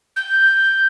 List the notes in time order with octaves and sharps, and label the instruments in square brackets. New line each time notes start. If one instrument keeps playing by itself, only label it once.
[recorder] G6